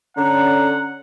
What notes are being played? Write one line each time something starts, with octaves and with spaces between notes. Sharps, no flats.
D3 C#4 F#5 A#5